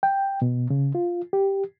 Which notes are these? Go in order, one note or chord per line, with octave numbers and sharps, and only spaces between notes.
G5
B2
C#3
F4
G4